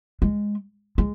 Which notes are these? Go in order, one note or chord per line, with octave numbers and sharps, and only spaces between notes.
G#3
G#3